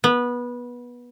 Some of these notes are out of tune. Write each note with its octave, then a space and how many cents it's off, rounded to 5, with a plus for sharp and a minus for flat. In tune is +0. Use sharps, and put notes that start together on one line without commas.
B3 -20